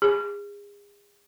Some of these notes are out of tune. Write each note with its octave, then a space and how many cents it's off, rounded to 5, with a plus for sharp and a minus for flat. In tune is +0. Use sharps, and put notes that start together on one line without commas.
G#4 -35